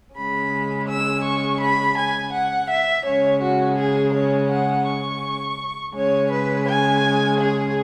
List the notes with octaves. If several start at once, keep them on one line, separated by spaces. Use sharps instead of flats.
C#3 G#3 C#4 B5
E6
C#6
B5
G#5
F#5
E5
C#3 G#3 C#4 C#5
F#4
G#4
C#5
F#5
C#6
C#3 G#3 C#4 C#5
B4
G#5
G#4